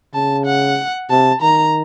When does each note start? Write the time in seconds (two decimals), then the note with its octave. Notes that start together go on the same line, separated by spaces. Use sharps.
0.14 C#3 A5
0.46 F#5
1.10 C3 A5
1.42 D#3 A#5